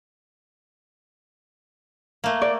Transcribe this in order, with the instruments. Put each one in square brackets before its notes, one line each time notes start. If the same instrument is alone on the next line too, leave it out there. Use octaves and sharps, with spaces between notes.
[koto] A3 A#3
[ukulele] D5